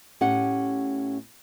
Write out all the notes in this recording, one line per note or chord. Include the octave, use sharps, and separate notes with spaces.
A2 C#4 G4 F#5